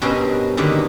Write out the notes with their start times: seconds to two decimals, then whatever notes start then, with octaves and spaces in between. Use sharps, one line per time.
0.02 G2 B2 C4 C#4 A#4 C5
0.57 B2 D3 D#3 A#3 G4